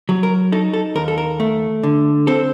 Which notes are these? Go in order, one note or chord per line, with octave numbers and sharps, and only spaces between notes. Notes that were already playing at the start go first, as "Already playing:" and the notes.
F#3
A#4
D#4 A4
A4
D#2 A#4
A4
A#4
A3
D3
C4 A4